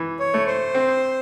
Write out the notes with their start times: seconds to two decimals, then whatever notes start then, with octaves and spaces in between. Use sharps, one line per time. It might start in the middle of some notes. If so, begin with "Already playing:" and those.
Already playing: E3
0.19 C#5
0.34 A3
0.47 C5
0.74 C4